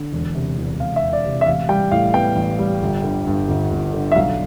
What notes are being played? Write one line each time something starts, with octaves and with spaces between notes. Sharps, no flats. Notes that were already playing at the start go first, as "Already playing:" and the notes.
Already playing: D3
E1
C3
E2
E1 F5
E5
E1
D5
C3
E5
A1 F5
G3 G5
A2 F5
B3 G5
A1
G3
G1
D3
G2
G1
G1
D3
E5
B1 F5